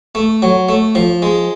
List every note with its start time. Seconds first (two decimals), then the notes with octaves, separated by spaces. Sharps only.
0.15 A3
0.42 F#3
0.69 A3
0.95 F3
1.22 G#3